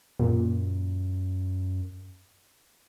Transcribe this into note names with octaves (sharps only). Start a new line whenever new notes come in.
F#2 A#2